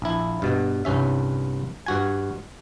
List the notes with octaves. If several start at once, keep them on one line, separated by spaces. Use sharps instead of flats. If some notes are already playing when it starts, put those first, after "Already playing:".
A#1 E4
G2 B2
C2 G2 C#4 E5
G2 F#4 G#5